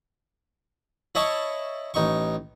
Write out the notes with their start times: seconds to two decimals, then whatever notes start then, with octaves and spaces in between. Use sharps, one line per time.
1.15 E4 C#5 D#5 A5 C#6
1.94 A1 D#4 C#6